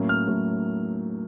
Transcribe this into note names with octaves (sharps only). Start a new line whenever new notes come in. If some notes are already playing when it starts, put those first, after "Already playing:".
Already playing: A2 F#3 A#3 C#4
F6
A2 F#3 A#3 C#4